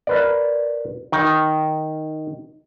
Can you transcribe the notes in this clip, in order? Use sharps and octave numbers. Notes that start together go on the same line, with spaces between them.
A#4 B4 D5
D#3 D#4